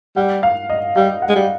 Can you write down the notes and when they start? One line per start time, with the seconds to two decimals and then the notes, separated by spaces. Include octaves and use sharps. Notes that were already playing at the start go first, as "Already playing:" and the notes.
0.16 G3 F#5
0.43 F5
0.70 D#5
0.96 G3 F5
1.22 F#5
1.29 G#3
1.36 G3